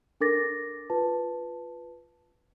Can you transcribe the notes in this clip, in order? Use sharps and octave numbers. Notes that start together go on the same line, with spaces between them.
D4 A4 A#4 D6 A6 A#6
F4 B4 A5